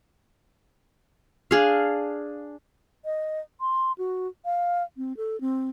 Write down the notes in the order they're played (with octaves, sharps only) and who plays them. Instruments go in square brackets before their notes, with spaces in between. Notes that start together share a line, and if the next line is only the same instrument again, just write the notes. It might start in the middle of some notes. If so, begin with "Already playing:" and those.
[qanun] D4 G#4 F5
[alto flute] D#5
C6
F#4
F5
C4
A4
C4